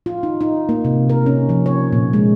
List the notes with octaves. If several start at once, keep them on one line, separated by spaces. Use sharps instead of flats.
F4
D#4
D#4
A#3
C3
A#4
C#4
F3
C#5
A#2
G#3